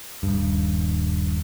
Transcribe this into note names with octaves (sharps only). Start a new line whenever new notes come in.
D#1 G2